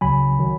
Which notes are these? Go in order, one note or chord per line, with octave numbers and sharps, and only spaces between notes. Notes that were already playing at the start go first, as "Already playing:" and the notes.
C#2 C#3 F#3 G#5 B5
D#3 F#3